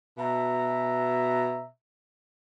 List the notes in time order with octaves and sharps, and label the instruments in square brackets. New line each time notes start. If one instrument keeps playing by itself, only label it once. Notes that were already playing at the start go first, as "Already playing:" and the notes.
[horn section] B2 E5 A#5